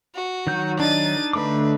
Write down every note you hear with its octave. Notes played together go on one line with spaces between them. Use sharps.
F#4
D#3 F#3 G6
D4 D#4 A6 D#7
D3 A3 B4 D6